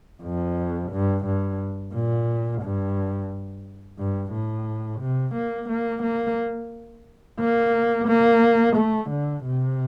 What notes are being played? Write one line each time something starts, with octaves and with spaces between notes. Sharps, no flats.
F2
G2
G2
A#2
G2
G2
A2
C3
A#3
A#3
A#3
A#3
A#3
A3
D3
C3